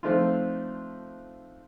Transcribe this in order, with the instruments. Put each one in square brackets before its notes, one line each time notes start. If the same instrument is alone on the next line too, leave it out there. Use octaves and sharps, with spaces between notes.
[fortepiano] F3 A3 C4 D4 D#4 F4